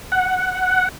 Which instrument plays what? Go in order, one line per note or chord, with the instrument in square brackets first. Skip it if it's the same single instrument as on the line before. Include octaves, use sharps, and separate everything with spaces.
[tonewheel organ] F#5